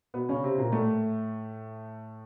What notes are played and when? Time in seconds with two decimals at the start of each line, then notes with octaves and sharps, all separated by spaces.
0.14 B2 B3
0.29 C#3 C#4
0.43 C3 C4
0.58 A#2 A#3
0.72 A2 A3